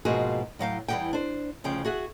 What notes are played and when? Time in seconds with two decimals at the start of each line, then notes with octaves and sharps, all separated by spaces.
0.05 G#2 B2 F3 A#3 F#4 G#4
0.59 A2 F#3 F5 G5
0.88 E2 E3 G3 G4 F#5 G5
1.13 D4 C5
1.64 D2 C#3 F3 G5
1.85 F#4 G#4 E5 F#5